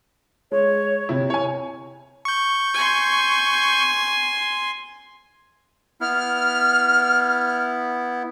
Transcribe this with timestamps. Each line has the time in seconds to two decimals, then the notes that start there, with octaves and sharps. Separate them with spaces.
0.52 G#3 C#5
1.09 C3 E4
1.30 C#5 G#5
2.25 C#6 G6
2.74 G#5 C6
6.01 B3 E4 F6